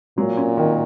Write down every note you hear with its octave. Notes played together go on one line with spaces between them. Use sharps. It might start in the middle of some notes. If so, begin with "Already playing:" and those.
A#2 F#3
C#4
D#3